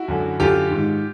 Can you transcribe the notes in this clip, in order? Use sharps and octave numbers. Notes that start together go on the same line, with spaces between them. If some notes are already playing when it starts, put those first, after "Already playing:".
Already playing: E4 F#4
F#2 D3
F#2 D3 F4 G4
G#2 D#3